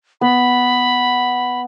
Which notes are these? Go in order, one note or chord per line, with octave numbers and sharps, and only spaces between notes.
B3 B5